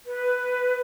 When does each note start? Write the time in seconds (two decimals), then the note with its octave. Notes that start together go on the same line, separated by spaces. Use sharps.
0.07 B4